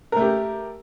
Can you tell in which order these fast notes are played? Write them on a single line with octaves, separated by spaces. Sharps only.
A#4 A3 G4